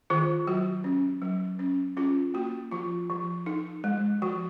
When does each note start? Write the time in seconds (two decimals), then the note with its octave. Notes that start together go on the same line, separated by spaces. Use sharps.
0.10 D#3 F4 G#4
0.47 F#3 F#4
0.84 C#4
1.22 F#3
1.59 C#4
1.97 C#4 F4 G#4
2.34 A#3 F#4
2.71 F3 F4
3.10 F3
3.46 D#4
3.84 G#3
4.22 F3 F#4